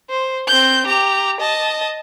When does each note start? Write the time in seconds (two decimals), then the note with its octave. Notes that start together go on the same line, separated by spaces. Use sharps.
0.10 C5
0.48 C4 G6
0.86 G4 A#5
1.40 D#5 A5